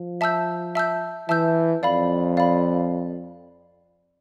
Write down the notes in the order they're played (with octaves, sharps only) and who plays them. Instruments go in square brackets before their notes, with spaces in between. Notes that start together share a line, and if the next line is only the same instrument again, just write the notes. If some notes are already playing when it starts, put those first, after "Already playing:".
Already playing: [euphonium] F3
[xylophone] E5 A5 E6 G6
E5 A5 E6 G6
[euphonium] E3 [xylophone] E5 A5 E6 G6
[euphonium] F2 [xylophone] D5 F5 B5
[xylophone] D5 F5 B5